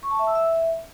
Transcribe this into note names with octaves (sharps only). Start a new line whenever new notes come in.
C#6
A5
E5
E6
E5